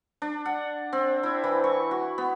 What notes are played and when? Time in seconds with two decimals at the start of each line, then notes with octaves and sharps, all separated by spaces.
0.22 D4
0.45 F#5
0.93 C4
1.23 E4
1.44 E3
1.64 C#6
1.91 F#4
2.18 B3